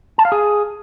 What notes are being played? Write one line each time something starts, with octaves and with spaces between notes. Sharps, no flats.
A5
F5
G#4